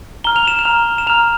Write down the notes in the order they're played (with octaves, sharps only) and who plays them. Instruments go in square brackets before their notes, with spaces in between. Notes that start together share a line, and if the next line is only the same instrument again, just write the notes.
[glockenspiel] A#5 F6 G7
F7
E7
F7
A#5 F6
E7
A#5 F6 F7